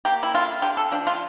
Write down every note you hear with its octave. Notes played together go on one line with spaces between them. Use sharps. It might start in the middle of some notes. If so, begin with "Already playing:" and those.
A#3 G4
E4
D3 F4
D3 G4
A4
F3 D4
F4